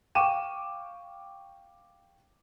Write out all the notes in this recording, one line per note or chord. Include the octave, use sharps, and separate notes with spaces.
F5 G5 C#6 D6 D#7 E7